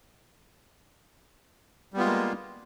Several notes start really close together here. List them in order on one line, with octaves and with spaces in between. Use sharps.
G3 B3 F4 G#3 A#3